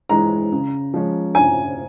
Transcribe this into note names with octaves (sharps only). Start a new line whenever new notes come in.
E3 G#3 A#5
C#3
F3 G#3 C#4
C#3 G#5